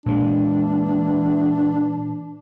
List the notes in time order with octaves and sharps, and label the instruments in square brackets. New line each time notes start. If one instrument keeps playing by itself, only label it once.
[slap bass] A#2 G#3 [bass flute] E3 [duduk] D4